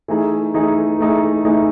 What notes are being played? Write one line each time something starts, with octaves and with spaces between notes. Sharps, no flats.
E3 A3 D#4 G#4
E3 A3 D#4 G#4
E3 A3 D#4 G#4
E3 A3 D#4 G#4